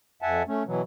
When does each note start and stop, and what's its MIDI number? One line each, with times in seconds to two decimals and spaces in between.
0.22 0.43 41
0.22 0.43 76
0.22 0.43 78
0.22 0.43 80
0.22 0.43 81
0.48 0.63 57
0.48 0.63 61
0.66 0.82 47
0.66 0.82 52
0.66 0.82 54